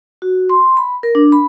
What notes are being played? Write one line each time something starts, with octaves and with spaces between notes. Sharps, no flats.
F#4
C6
B5
A#4
D4
B5